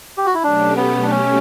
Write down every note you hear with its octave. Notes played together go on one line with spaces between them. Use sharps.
G4
F#4
E4
B2 F#3 A3 C#4 D4 G4
B3
D4
C#4